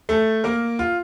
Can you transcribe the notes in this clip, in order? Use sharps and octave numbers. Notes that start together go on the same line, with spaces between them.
A3 A4
A#3 A#4
F4